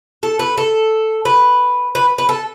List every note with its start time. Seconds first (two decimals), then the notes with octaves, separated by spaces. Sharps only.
0.23 A4
0.39 B4
0.58 A4
1.25 B4
1.95 B4
2.18 B4
2.29 A4